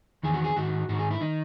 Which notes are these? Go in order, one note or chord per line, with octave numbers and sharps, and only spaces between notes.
E2 D#3 G#4
F#4
G#4
G#2 D#3 F#4
G#2 D#3 F#4
G#4
E4
D#3 D#4